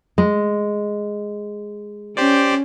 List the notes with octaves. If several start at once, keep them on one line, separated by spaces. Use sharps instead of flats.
G#3
C#4 G4 C5 D5